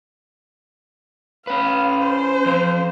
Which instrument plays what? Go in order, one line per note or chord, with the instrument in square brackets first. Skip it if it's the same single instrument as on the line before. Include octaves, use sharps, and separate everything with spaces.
[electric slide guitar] C#4 B4 [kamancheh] F5
[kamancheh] C5
[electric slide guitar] F3 C4